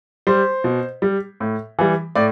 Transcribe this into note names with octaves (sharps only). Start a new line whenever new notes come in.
G3 C5
B2
G3
A2
E3 G3
A2 D5